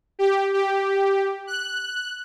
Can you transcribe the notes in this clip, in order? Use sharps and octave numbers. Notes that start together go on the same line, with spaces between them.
G4
G4
F#6